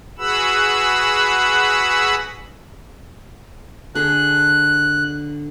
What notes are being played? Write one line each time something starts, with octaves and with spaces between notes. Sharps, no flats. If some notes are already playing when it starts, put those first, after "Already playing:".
F#4 G#4 B4 F#5 B5 E6
D3 G#4 F#6